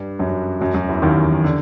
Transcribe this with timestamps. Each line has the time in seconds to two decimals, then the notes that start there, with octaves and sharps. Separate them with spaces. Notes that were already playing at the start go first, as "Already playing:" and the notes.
Already playing: G2 G3
0.19 F#2 F#3
0.61 F#2 F#3
0.74 F#2 F#3
0.89 E2 E3
1.02 D#2 D#3
1.44 D3